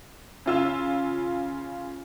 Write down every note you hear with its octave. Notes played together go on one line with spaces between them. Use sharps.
C#3 F4 E6